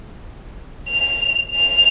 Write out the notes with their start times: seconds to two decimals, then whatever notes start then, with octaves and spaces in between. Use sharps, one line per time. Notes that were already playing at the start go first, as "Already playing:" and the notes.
0.89 F7
1.55 F7